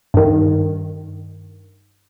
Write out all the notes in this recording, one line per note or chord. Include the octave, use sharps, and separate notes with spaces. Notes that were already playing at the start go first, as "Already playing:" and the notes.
G2 D#3